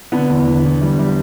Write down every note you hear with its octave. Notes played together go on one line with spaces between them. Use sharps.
D3 B3
E2
E2
E2
G3
G3